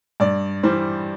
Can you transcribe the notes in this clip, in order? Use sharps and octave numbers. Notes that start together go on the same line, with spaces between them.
G2 D5
E3 G3 C5